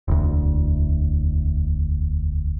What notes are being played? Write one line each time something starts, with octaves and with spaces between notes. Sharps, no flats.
E1 D2